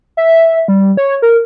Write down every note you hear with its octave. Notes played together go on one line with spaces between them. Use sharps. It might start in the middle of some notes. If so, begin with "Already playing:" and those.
E5
G3
C#5
A#4